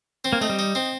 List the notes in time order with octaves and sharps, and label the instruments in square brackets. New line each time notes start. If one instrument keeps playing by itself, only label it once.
[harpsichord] C4
[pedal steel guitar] A#3
[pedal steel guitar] A3 [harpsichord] D#4
[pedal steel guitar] G3
[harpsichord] D#4
C4